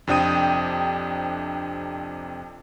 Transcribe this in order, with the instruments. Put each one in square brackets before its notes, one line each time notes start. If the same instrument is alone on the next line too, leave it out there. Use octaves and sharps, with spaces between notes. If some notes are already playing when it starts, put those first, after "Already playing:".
[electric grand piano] F2 C3 D4 G5 D#6 D#7